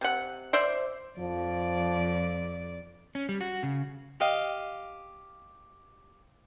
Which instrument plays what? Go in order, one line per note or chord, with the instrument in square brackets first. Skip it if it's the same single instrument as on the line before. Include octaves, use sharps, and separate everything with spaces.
[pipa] C3 F#5
C5 D5 E5
[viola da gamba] F2 D5 [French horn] F3
[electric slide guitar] C#4
G3
F#4
C#3
[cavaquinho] G4 D#5 F5